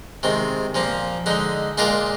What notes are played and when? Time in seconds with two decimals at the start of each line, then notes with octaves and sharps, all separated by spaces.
0.23 C3 D#3 G#3
0.75 A#2 F3 A#3
1.26 D3 G#3 D#4
1.78 A#2 G#3 D4 F4 A#4